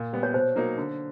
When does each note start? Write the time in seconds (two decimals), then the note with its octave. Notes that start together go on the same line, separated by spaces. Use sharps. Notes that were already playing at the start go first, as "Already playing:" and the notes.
Already playing: A#2
0.13 G3 B3
0.23 C#5
0.34 B2 C5
0.56 F#3 A#3 D#4
0.78 D3